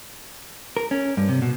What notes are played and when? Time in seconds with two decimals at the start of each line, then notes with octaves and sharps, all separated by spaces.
0.77 A#4
0.91 C#4
1.17 G2
1.29 C3
1.42 B2